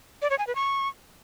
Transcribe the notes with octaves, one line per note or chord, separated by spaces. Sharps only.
D5
C#5
G#5
B4
C#6